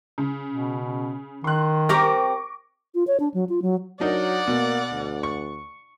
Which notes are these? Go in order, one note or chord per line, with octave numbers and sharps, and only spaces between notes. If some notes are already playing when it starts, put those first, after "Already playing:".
C#3
B2
D#3 C6 F#6
C4 G4 A#4 C#6 D6 A#6
F4
C#5
D4
F#3
F4
F#3
F#3 D4 D#4 A#4 D5 F#5
B2 A#3
D2
C#6